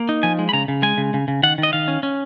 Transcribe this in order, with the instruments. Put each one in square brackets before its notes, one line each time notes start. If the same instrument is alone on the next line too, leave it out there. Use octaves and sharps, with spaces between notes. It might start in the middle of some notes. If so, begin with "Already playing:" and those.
Already playing: [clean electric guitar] A#3
D#4
F3 G#5
G#3
B5
C#3 A#5
C#3
G#3 G#5
C#3
C#3
C#3
D#3 F#5
D#3
D#5
D#3 F5
C#4
C#4